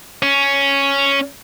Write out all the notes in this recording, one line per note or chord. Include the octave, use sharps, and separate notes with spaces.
C#4